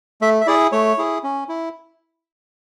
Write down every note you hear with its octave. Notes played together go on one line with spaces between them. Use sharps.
A3 E5
E5
E4 G#4 D5
A3 C#5
E4 G#4
C#4
E4